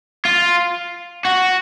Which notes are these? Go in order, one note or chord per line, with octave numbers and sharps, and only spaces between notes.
F4
F#4